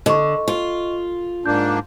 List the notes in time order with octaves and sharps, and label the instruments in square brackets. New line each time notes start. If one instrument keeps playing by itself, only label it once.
[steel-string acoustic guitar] D3 [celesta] D#5 C#6
[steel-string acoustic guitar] F4
[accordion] G#2 A#3 D4 [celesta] G6